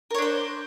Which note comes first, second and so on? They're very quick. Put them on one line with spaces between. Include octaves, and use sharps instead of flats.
A#4 C#5 D4 C5